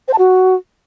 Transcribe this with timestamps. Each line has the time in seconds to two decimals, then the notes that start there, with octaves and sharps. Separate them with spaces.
0.08 C5
0.13 A5
0.19 F#4